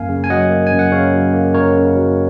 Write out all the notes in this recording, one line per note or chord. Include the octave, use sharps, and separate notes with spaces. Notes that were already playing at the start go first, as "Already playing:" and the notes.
Already playing: F#2 A#3 F5 G#5
C#3
G#5
F#3 D#5 F#5
A#3
F#2 G#5
F#5
C#3 C#5 F5
F#3
A#3
F#2 A#4 C#5
C#3
F#3